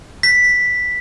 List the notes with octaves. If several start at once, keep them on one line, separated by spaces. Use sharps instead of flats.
B6